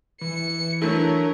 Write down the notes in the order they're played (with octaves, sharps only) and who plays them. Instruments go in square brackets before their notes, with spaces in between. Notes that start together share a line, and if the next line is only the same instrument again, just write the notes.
[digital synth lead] E3 [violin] C#7
[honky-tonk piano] F#3 A3 E4 [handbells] D4 A4 [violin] A#4 C#5